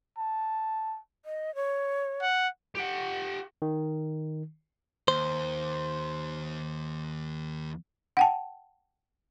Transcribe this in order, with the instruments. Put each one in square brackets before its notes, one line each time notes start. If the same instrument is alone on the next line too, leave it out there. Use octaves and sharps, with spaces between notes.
[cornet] A5
[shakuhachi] D#5
C#5
[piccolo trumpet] F#5
[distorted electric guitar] G4 F#5
[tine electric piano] D#3
[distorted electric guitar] D#2 [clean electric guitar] C5
[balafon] F#5 G5 A5